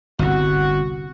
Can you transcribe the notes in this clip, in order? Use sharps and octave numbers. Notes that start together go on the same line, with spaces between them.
G1 C2 F#4